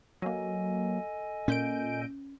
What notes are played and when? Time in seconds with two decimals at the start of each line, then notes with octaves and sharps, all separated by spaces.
0.22 F#3 A#3 A4 D#5 G#5
1.48 A#2 C#4 G6 D7